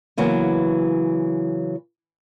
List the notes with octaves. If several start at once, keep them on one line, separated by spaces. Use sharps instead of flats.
C#3 E3 F#3 A#3 B3